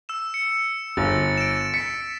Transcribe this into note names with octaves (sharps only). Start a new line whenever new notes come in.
E6 E7
C#7
G1 A6
D7 E7
B6 C#7